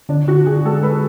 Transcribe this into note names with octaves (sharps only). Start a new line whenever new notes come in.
D3 D4
D3 F#4
D3 G#4
G#3 A4
G#3 B4